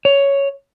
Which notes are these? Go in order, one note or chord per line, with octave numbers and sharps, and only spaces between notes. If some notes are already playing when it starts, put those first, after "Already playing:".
C#5